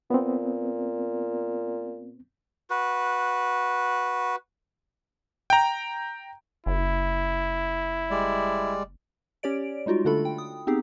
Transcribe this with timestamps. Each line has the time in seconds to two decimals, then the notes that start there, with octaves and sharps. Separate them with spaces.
0.10 A#2 B3 C4
2.70 F#4 B4
5.50 G5 A#5
6.66 F#1 E4
8.10 G3 G#3 D5
9.43 C#4 G4 C#5 D5 D7
9.86 G3 G#3 D#4 F4 F#4
10.05 D3 A3 D4 F4 A4 B5
10.25 G5
10.38 D#6
10.67 B3 C4 D#4 G4 G#4